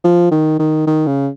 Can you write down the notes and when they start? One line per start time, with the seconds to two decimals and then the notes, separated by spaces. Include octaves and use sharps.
0.04 F3
0.31 D#3
0.59 D#3
0.87 D#3
1.07 C#3